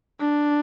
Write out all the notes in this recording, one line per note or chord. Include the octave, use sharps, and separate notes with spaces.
D4